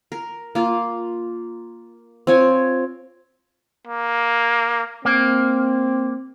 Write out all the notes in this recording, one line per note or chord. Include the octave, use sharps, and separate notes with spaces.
A#4
A#3 F4
C4 F4 C#5 G#5
A#3
A#3 C4